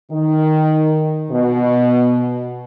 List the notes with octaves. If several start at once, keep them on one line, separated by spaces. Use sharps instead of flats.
D#3
B2